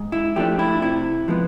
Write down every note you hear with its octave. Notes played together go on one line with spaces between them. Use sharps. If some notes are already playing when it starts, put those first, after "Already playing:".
Already playing: G#2
E4
F3 A3 D4 G4
E4
C3 E4
F3 G#3 B3